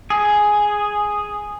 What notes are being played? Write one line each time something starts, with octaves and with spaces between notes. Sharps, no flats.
G#4